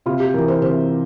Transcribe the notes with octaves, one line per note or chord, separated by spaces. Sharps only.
C3 F4
G4
E3 A#4
C5
C3 C5